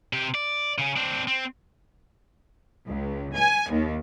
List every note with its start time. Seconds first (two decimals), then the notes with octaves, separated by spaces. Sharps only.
0.13 C3 G4
0.35 D5
0.78 C#3 C#4
0.96 C4 D4
1.27 C4
2.89 C#2
3.37 G#5
3.71 D#2